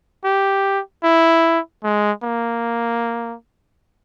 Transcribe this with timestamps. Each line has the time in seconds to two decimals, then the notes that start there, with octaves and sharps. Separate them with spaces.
0.25 G4
1.04 E4
1.84 G#3
2.24 A#3